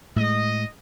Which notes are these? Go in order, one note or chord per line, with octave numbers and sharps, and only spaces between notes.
A2 G#3 D#5